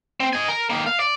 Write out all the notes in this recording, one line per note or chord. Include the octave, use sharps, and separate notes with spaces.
C4
D#4 G#5
A#4
D#3 A#3
F5
D5